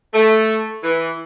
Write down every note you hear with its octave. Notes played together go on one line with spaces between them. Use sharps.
A3
E3